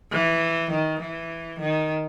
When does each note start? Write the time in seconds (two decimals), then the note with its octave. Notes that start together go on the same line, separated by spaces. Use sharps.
0.12 E3
0.71 D#3
1.00 E3
1.59 D#3